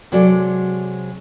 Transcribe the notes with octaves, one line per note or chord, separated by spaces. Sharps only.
C3 F#3 G#3 F#4 A4 D5